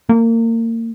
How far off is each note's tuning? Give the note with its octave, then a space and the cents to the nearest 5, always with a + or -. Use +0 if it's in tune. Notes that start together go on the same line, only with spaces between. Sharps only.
A#3 -30